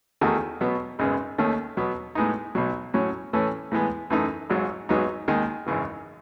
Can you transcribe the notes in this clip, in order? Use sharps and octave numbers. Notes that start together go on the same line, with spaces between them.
E2 D#3 A3 D#4 F#4
B2 F#3 B3
G#1 F#2 C#3 G#3 B3
D#2 D#3 A3 C#4
B2 F#3 B3
A2 G#3 B3 D#4
B1 B2 F#3
A2 F#3 C#4
A2 E3 A3 C#4
A2 E3 G#3 B3
F#2 E3 A3 D#4
G#1 G#2 F#3
G#1 G#2 F#3 B3 D#4
D#2 D#3 G#3 D#4
G#1 F#2 C#3 E3